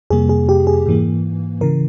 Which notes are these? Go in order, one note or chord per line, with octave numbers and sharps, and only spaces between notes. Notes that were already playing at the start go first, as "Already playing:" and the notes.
F2 C3 G3 A#3 G#4
G#4
G4
G#4
G#2 E3 A#3
C#3 E3 A#4